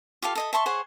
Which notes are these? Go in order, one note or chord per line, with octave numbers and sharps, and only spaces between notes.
F4 G4 A4 F5
A4 D#5 E5
E5 A5 C6 C#6
G#4 C5 C#5 F#5